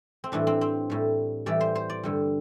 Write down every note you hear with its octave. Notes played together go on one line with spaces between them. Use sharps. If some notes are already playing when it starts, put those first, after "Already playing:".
C4
A2 E3 G3 D4
C4
C4
A2 G3
A2 E3 G3 D5
C5
C5
D5
G2 D3 G3